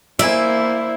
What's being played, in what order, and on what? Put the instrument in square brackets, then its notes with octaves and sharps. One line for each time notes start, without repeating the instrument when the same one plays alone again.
[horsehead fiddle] A#3 C5 [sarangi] E4 [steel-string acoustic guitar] D5 [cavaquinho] E5 G#5